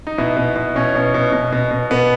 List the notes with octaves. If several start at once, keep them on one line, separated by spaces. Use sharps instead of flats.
D#4
B2 E4
B2
B2
B2 C#4
B2
B2
B2
B2
B2
B2 B3